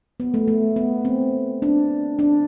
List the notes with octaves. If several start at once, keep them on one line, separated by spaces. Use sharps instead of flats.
B3
A3
A3
B3
C4
D4
D4